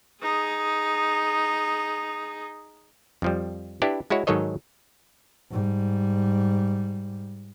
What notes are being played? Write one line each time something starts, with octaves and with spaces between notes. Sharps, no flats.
D#4 G#4
F2 F3 G3
D4 E4 G4 B4
G#3 E4 F#4 C#5
G#2 D#3 F#3 A4 C#5 D#5
G#2 G3